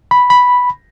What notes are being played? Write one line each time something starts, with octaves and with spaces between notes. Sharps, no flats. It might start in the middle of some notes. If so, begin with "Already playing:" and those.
B5
B5